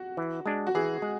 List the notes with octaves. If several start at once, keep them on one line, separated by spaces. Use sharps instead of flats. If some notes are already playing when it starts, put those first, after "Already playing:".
Already playing: F#4
E3
G#3 D4
F#4
E3 G#4
G#3